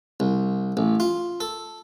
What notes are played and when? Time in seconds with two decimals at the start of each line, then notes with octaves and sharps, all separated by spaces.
0.20 C2
0.77 A1
1.00 F4
1.40 A4